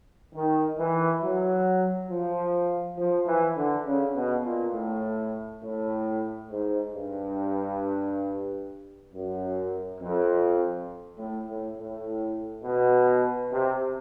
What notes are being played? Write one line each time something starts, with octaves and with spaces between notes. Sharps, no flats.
D#3
E3
F#3
F3
F3
E3
D3
C#3
B2
A#2
A2
A2
G#2
G2
F#2
F2
A2
A2
A2
B2
C3